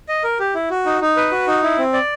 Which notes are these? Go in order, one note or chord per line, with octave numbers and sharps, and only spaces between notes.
D#5
A#4
G4
E4
F#4
D#4
D#4
B4
F#4
D#4
E4
C4
D5